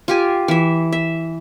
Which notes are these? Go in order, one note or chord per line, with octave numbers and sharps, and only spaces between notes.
F4 G4 G#5
E3 E5
E5